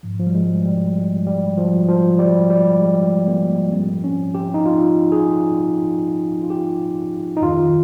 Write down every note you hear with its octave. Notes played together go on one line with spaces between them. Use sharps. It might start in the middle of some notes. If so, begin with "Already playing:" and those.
G#2 F3
F3
G3
G#3
G3
G#3
G3
F3
F3
G3
G3
G#3
A#3
G#2 F3 C4
C#4
G4
D#4
F4
G#4
F4
G4
D#4
F2 D#3 F4